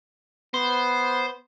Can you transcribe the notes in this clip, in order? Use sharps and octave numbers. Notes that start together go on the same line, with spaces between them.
B3 C5